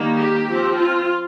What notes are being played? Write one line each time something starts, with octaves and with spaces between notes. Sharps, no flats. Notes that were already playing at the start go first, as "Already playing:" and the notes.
Already playing: D#3 G3 A#3
G4
F3 C4
F4